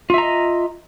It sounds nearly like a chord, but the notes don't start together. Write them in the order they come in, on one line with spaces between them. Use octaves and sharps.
F4 E5 A#5 D#5